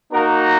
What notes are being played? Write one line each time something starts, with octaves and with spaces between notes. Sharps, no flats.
A#3 D#4 F#4 A#4